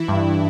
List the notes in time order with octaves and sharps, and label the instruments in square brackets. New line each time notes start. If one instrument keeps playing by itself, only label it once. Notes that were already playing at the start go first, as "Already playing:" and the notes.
Already playing: [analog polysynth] E3 E4
[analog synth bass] G2